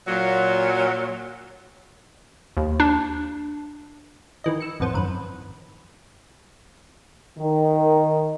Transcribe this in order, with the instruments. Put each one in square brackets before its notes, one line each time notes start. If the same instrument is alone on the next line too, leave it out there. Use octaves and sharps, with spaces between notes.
[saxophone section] A#2 F#3
[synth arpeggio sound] D#2
D4
[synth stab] D#3 E3 D#5
E6 C#7
A1 F2 B3 C5
G#1 F#2 B4
[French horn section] D#3